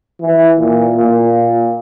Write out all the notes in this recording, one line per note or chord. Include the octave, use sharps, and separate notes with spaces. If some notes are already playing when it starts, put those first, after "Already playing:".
E3
A#2
A#2